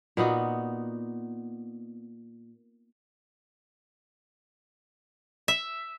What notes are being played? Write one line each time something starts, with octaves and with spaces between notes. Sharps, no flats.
A#2 B3 D#4 F#4
E5